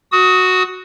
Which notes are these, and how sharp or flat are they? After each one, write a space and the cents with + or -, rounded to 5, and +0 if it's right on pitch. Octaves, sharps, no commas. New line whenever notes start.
F#4 +0 D#6 +25